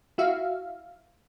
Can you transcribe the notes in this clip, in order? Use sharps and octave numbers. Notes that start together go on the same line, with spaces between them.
E4 F#4 E5 F5